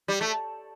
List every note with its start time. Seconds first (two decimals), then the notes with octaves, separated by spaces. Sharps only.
0.08 G3
0.21 A3